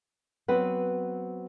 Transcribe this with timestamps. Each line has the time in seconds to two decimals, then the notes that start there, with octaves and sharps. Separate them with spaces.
0.48 F#3 B3 C4 B4 F#5